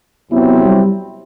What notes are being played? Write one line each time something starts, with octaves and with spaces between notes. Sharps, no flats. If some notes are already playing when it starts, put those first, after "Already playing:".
E2 C3 F#3 B3 C4 E4
G3